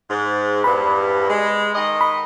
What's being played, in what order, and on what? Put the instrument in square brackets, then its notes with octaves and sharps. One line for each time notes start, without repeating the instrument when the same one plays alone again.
[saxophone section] G#2
[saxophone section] E2 G2 [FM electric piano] B5
[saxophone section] G#3
D#3 D#5
[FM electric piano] B5